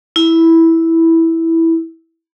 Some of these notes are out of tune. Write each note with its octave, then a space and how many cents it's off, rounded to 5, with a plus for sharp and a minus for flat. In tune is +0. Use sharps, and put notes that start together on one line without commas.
E4 -5